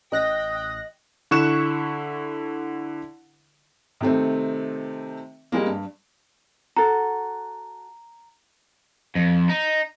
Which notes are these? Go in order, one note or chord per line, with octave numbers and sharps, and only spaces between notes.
A1 D#5 G5 D#6 F#6 A#6
D3 E4 C#6 F#6 E7
C3 D#3 A3 C4
G3 G#3 A#3
G2
F#4 A4 A#5
F2
D#4